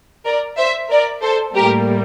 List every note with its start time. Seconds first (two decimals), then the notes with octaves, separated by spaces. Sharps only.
0.25 A#4 D5
0.57 C5 E5
0.90 A#4 D5
1.22 A4 C5
1.55 A2 G3 A#3 G4 A#4